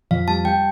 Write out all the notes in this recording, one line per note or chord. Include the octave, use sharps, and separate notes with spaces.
F2 F5
G3 A5
G3 G5